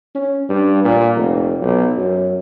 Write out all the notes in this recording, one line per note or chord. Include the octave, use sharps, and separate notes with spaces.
C#4
G2
A#2
F1
B1
F#2